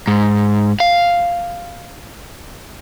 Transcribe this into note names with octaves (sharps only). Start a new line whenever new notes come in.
G#2
F5